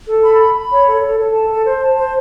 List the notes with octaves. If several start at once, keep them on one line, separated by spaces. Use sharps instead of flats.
A4
B5
B5
B5
C#5
A4
A4
A4
A5
A4
C5
A5
C5